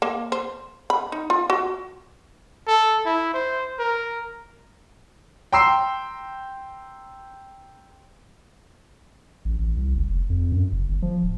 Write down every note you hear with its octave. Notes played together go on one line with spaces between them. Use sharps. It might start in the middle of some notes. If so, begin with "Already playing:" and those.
A#3
C5
B5
D#4
F4
F#4
A4
E4
C5
A#4
G5 A#5 C6 E6 C7
A1
A1
C2
F#1
F1
F2
F#2
F#1
G1
F3
D1